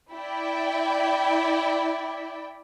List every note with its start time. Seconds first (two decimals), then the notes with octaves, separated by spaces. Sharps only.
0.13 E4 D5 G5